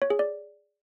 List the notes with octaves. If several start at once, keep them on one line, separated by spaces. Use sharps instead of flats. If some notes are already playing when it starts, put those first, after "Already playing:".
C#5
G#4
D5